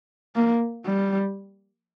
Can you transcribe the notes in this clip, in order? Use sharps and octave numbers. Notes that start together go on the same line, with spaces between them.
A#3
G3